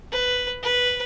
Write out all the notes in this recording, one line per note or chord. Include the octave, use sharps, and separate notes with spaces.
B4
B4